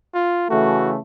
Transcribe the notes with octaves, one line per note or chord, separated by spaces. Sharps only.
F4
C#3 E3 A3 F#4